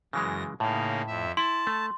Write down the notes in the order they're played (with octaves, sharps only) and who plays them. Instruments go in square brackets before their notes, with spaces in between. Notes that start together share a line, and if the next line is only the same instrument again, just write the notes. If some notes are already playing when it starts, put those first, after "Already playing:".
[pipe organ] F#2 A#6 [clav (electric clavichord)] C#3 E3 G#3
[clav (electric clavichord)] A2 [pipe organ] C#3 A#3 D#4
[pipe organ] F2 E5
[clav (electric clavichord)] E4 [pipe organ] A5 [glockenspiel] C6
[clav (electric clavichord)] A3